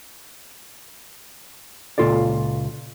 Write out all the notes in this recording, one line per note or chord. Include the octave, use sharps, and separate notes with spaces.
C#2 A#2 F4 A4 D5